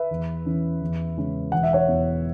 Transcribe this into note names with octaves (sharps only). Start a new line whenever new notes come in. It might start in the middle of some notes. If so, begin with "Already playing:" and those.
Already playing: B4 E5
E2
E3 C#4
E2
C#3 G#3 C#4
E1 F#5
E5
C#5 F#5
E2 E3 B3